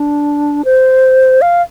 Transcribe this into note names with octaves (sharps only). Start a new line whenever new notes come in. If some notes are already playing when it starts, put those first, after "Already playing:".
Already playing: D4
C5
F5